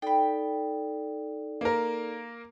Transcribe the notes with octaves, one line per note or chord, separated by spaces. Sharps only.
D#4 A4 D5 G5 B5
A#3 A#4